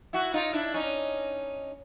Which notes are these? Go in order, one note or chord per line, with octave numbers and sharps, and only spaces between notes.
E4 F#4
D#4 F4
D4 E4
C#4 D#4